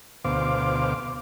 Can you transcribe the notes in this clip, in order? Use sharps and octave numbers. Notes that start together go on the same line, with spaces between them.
D2 B2 C5 F5 D6